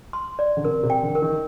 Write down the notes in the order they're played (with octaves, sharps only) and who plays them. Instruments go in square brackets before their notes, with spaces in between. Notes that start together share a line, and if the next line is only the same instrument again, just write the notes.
[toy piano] C6
D5
[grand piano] D3
[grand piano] C3 [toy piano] A#4
[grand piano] C3
[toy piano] G5
[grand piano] D3
[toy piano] A#4
[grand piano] D#3